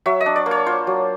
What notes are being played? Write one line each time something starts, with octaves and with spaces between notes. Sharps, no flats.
F#3 E5
D#5
D4
D5
A#3
C#5
F4 C5
F#3